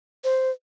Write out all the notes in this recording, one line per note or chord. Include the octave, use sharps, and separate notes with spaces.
C5